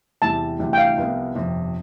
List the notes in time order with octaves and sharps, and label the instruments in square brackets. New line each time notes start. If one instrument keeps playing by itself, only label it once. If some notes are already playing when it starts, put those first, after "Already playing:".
[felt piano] E2 C3 E3 G3 [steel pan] A5
[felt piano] D2 C3 E3 G3 D4
[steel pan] G5
F5
[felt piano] C2 C3 F3 B3 F4
G1 F2 C3